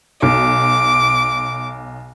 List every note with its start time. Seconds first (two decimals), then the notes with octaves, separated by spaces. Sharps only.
0.22 B1 D6